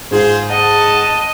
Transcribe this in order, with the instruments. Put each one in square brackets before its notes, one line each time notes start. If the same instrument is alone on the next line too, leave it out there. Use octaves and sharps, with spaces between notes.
[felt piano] G#2 [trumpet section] F4 G#4 C5
[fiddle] D#5 [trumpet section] F#5 A5